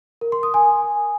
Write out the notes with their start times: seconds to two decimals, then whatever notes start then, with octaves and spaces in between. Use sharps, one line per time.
0.21 A#4
0.32 C6
0.43 D#6
0.54 G#5